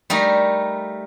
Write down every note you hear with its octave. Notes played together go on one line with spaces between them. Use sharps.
G3 A3 D#4 A#4